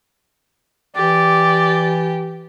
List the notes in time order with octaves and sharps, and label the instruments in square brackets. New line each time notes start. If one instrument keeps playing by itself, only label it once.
[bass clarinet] E3 [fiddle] G4 [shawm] D5